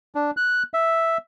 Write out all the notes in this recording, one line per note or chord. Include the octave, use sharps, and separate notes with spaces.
D4
F#6
E5